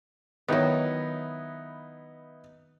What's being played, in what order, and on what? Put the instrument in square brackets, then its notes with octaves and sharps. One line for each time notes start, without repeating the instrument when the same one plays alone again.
[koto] D#3 F#3 [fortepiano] B3 D#4 E4